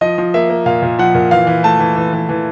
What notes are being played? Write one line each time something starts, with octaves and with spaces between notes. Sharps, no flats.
F3 D#5
F3
A#3 E5
A#3
A#2 F5
A#2
F3 F#5
A#2
E3 F5
E3
A3 A5
E3
E3
E3
E3